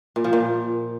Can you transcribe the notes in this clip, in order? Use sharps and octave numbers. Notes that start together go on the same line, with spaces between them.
A#2
F3
A#2